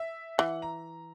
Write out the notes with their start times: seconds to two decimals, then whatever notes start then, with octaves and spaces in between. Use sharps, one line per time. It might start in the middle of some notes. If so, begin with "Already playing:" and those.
Already playing: E5
0.38 E3 F#5
0.62 A#5